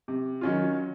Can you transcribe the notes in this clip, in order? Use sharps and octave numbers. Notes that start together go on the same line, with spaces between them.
C3
D#3 F#3 C#4 F4